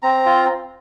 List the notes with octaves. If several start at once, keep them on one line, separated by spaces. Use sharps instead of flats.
C4 A#5
F4